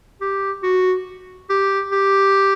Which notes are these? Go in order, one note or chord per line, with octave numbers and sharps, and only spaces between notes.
G4
F#4
G4
G4